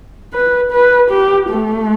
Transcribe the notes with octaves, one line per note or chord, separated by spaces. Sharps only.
B4
B4
G4
A3